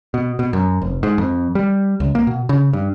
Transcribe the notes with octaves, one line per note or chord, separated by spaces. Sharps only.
B2
B2
F#2
F1
G#2
F2
G3
C#2
A#3
B2
C#3
G2